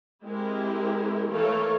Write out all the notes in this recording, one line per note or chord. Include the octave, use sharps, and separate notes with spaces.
G#3 C4 E4 G4 A#4
E3 A3 A4 A#4 C#5 F5